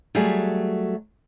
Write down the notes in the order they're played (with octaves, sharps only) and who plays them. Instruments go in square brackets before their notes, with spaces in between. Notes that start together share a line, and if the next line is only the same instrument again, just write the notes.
[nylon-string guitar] F#3 G3 A3 G#4